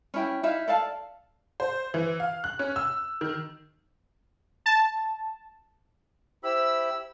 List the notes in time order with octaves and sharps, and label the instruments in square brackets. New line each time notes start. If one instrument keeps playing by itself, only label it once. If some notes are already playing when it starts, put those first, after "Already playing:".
[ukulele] C#4 E4 G5
D#4 E4 E5 F5
A4 D5 F5 A5
[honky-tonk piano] C5
E3
F5
F#6
C#4
E6
D#3
[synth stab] A5
[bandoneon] E4 G4 B5 [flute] C5 [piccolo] E6